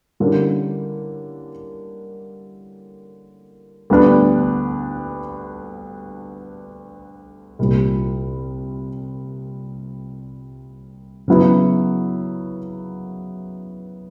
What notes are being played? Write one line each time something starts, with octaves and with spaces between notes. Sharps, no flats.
D3 G3 A#3 C#4 E4
D2 D3 G3 B3 D4
C2 A#2 G3
C#3 F#3 B3 E4